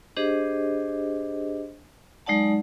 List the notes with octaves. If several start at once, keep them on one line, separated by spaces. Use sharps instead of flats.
D4 G4 G#4 C5 D#5
F#3 G#3 D#4 D5 F#5 A5